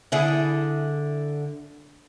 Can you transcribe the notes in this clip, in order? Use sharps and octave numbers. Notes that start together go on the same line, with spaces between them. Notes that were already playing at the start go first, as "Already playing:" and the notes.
D3 E4 G#4